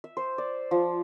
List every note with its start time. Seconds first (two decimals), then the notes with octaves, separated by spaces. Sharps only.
0.04 E5
0.17 C5
0.38 D5
0.71 F3